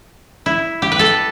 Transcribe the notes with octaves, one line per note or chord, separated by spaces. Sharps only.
E4
G4
B4
A4